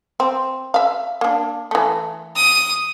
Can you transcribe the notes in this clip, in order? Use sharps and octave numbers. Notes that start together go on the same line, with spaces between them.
C4
E5 F5
A#3 D4
E3 A3
D#6